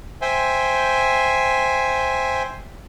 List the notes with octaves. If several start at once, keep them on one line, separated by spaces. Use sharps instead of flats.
C5 E5 G5 G#5